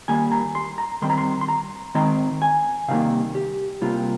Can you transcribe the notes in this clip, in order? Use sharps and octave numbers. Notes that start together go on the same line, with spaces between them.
D#3 G3 A#3 G#5
A#5
C6
A#5
D#3 G3 C4 C6
A#5
C6
C6
A#5
D#3 G#3 C4 A#5
G#5
C3 D#3 G3 A#3 F5
G4
C3 G3 A#3 F4